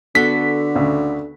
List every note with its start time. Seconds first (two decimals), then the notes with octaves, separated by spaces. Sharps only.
0.15 D3 B3 F#4 A4 B6
0.75 D2 C#3